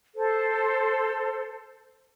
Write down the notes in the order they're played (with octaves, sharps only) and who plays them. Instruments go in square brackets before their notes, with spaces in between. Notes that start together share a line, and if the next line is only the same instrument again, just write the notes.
[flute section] A4 C5